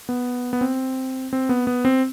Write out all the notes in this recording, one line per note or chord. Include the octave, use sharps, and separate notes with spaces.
B3
B3
C4
C4
B3
B3
C4